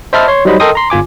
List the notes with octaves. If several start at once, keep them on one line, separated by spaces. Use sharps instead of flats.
C5 D#5 E5 A5 B5 F6
C#5 C6
F#3 G3 D#4 C5 D#5 B5
A4 A#4 D#5 G5 C6 D#6
A#5 C6
G1 F4 G#5 D6